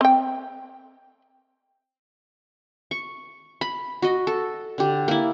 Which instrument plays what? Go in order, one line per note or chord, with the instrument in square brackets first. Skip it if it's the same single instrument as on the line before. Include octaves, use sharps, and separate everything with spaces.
[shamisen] C4 G5
[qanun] C#6
B5
F#4 D#5
A4
D3 G4
A#3 E4